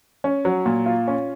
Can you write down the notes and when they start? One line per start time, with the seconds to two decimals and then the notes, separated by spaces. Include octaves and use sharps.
0.24 C#4
0.45 F#3
0.66 A#2
0.86 F4
1.08 C#4